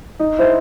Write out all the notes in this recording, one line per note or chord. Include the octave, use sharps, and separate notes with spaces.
D#4
E4 C5